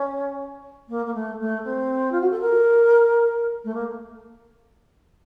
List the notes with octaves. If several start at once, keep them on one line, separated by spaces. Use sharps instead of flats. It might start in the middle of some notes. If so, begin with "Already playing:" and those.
Already playing: C#4
A#3
A#3
A3
A3
C4
F4
F#4
A4
A#4
A3
A#3